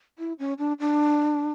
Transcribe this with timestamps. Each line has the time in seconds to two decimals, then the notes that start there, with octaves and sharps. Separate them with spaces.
0.19 E4
0.39 C#4
0.59 D4
0.80 D4